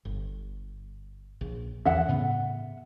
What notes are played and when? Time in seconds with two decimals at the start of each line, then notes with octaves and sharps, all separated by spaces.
0.05 G1
1.41 A#1
1.85 E2 E3 C#4 E5 F#5
2.08 A2 C#3 B3